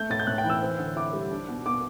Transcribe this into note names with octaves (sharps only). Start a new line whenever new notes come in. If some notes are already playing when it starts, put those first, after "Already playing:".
Already playing: A3 G6
A2 A6
G6
A2 F#6
G5
E3
E6
C4
D3
E4 D6
G3
D4
B2
B2 D6